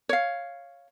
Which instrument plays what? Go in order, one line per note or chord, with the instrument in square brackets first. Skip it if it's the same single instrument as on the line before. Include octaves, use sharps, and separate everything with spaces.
[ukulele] C#5 F5